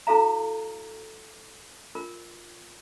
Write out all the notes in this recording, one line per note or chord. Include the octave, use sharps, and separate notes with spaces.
E4 F#4 A4 F5 A#5
F4 A#4